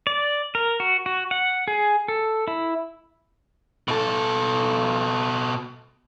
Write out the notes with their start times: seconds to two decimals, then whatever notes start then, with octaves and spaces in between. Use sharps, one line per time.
0.07 D5
0.55 A#4
0.80 F#4
1.06 F#4
1.31 F#5
1.68 G#4
2.08 A4
2.48 E4
3.88 B2 A4